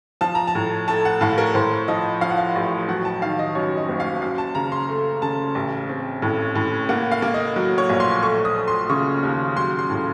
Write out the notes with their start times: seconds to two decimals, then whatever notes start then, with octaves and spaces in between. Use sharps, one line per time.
0.21 F3 A5
0.35 A#5
0.47 A5
0.55 A2
0.88 A3 A5
1.05 F#5
1.21 A2 F5
1.38 A#4
1.55 A2 C5
1.88 F3 D#5
2.21 F3 F5
2.30 F#5
2.38 F5
2.56 A1
2.88 F#3 F#5
3.05 A5
3.22 D#3 F5
3.39 D#5
3.55 F#2 C#5
3.77 D#5
3.89 F#1
4.00 F5
4.22 F#2 F5
4.38 A5
4.55 C#3 A#5
4.72 C6
4.89 A3
5.22 C#3 A5
5.55 A1
5.89 C4
6.22 A2
6.55 A2
6.89 A#3 F#5
7.11 F5
7.22 A#3
7.34 D#5
7.56 F#3
7.78 C#5
7.89 A#1
8.00 C6
8.23 A3 C#6
8.45 D#6
8.56 A3
8.68 C6
8.89 C#3 C#6
9.23 D#2
9.56 F#3 C6
9.79 C6
9.90 A2